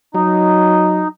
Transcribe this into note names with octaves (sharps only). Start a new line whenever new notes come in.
F#3 D#4